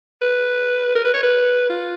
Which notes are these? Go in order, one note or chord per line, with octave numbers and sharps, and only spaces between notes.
B4
A#4
B4
C#5
B4
F4